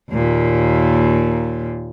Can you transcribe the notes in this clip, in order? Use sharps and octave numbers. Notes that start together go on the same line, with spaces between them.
D#2 A#2